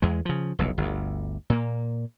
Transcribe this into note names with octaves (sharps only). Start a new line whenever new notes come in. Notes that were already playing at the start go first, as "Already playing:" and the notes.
E2 G#3
C#3 F3
F1 B1 E2
G1 D2
A#2 A#3